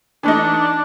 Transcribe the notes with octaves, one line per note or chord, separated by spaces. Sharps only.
E3 A3 D4 D#4